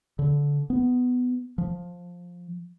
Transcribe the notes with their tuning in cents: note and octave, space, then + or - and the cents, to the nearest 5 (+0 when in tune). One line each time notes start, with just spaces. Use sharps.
D3 -25
B3 +10
F3 +10